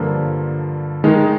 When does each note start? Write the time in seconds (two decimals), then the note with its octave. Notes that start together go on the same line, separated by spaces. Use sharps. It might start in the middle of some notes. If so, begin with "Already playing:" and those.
Already playing: G2 D3 F3 A#3 F4
1.04 D#3 G#3 D#4